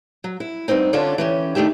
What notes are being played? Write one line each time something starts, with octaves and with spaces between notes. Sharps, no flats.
F#3
E4
G2 C3 B3 C4 D#4
D3 C#4 D4 F4 A4 D5
E3 C#4 G4
D#3 A3 D4 G4 E5